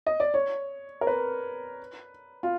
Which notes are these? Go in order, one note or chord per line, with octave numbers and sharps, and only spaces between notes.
D#5
D5
C#5
A#4
B4
F4